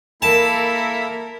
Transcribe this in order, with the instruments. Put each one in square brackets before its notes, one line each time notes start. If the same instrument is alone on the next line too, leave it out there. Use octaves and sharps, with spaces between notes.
[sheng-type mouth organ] A#3 A4 B5 [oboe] E4 [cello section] A#4 [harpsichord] A5